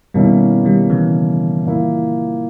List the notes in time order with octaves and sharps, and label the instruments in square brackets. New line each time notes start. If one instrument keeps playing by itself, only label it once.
[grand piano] B2 A#3 C#4 E4 [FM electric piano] D#3 G3
[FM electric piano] D#3 G3
C#3 E3
[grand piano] A#2 A#3 E4